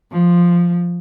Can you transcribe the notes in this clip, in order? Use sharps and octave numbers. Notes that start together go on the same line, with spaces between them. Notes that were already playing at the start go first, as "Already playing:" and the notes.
F3